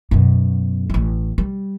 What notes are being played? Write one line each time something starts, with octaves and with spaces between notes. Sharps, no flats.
F#2 B2
A1 A3
G3